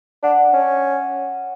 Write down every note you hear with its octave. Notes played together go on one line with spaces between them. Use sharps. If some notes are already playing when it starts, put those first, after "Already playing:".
D4 F#5
C#4